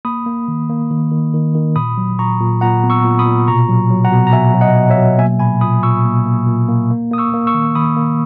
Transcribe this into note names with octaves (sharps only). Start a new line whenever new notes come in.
A#3 B5 D#6
A#3
D#3
A#3
D#3
D#3
D#3
D#3
A#2 B5 D#6
F#3
A#2 A#5 C#6
A#2
A#2 F#5 A#5
B3
C#6 E6
A#2
B5 D#6
A#2
B2 A#5 C#6
F#3
F#3
F#5 A#5
B2
A#5
B2 E5 G#5
F#3
D#5 F#5
B2
C#5 E5
F#3
A#3 E5 G#5
A#2 G#5 B5
A#2 B5 D#6
A#2 C#6 E6
A#3
A#3
A#2
A#3
A#3
A#3 D#6
C#6 E6
A#3
C#6 E6
D#3
D#3 B5 D#6
A#3